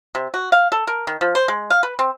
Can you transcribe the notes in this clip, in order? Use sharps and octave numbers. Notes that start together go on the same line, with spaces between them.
C3
F#4
F5
A4
A#4
D#3
F3
C5
G#3
F5
B4
C4